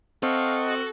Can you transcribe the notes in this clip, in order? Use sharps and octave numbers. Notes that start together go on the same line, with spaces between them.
C4 A4 D#5 F5 F#5 C#6
F#4